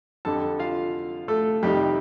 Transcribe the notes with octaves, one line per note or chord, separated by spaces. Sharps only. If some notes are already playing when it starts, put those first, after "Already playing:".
F2 D3 G3 A4 A5
F4 F5
A3 A4
F2 C3 D#3 G3 G4